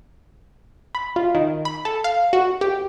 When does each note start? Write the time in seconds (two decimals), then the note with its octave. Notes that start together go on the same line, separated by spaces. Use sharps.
0.95 B5
1.16 F4
1.35 D#3
1.65 B5
1.85 A4
2.04 F5
2.33 F#4
2.61 G4